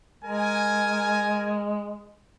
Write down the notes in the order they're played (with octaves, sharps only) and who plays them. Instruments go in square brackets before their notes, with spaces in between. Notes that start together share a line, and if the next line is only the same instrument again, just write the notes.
[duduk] G#3 [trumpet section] A#4 G#5